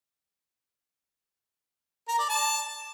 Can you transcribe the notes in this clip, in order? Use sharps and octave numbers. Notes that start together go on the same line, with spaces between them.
A#4
D5
A5